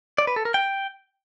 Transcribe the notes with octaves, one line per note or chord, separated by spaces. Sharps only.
D5
B4
A4
A#4
G5